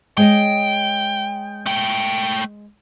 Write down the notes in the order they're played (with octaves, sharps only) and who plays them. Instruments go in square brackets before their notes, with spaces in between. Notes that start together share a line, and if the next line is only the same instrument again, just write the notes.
[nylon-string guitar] G#3 C#5 D#5 [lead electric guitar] G5
[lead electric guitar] A3 G5